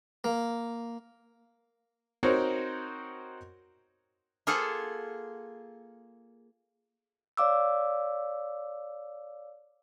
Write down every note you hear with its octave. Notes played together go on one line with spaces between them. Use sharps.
A#3
C4 D#4 F#4 A#4 C5 C#5
A#3 F4 G#4 A4 C5 F#5
C#5 D5 F5 D6 E6